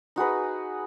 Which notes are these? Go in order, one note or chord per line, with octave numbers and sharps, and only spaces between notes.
D#4 F#4 G#4 B4